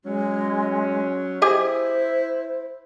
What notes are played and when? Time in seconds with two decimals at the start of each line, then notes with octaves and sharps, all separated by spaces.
0.05 F#3 G#3 C#4
1.42 E4 G4 G#4 C5 D#5